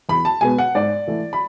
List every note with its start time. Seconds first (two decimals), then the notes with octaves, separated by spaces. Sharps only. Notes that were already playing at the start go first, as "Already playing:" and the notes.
0.09 E2 B5
0.25 A5
0.41 B2 G#3 B3 G#5
0.58 F#5
0.75 G#2 D5
1.07 E3 A3
1.33 B5